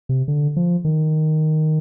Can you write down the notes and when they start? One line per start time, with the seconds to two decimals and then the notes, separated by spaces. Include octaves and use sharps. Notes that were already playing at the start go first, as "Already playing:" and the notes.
0.09 C3
0.28 D3
0.56 F3
0.85 D#3